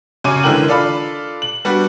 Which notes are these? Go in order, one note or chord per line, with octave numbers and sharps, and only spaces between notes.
F#2 C#3 C#4 G#5 D6 D#7
D3 E3 G#3 A#4 G5 F#7
D4 F4 A4 D5 F5 B5
F#7
G3 B3 D4 F#4